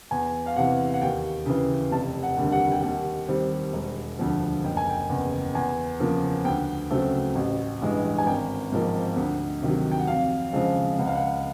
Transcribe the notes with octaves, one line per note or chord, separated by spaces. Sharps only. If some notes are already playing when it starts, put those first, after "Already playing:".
E2 G#5
F5
C3 E3 F#5
F#5
D#2 G5
C#3 E3
F1 A5
F#5
D#2 D3 G3
F#5
G5
D#2 F#5
D#3 G3 C4
E1
D2 D3 F3
F#1 G5
G#5
G5
E2 C#3
E2 G#5
C#3 F3 A#3
D2 G5
C#3 F#3 A3 C4
A1
G2 E3 G#3
G#5
G#1 G5
G#2 F3 A#3
D2
C3 D#3 F#3
G5
F#5
F2 F5
C#3 F3 G#3 C4
C#2 F#5
F5
F#5